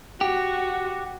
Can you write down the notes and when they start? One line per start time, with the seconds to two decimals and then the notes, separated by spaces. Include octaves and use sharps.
0.21 F#4 G4